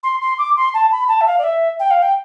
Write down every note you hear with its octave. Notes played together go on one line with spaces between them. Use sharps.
C6
C6
D6
C6
A5
B5
A5
E5
F5
D5
E5
G5
F5
G5